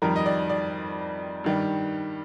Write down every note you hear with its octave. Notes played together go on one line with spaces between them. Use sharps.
F2 D#3 G3 A#4
D#5
D5
D5
G2 D#3 G3